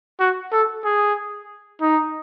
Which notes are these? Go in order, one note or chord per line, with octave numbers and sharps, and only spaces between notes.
F#4
A4
G#4
D#4